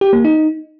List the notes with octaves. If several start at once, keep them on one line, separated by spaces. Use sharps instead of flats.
G4
A#3
D#4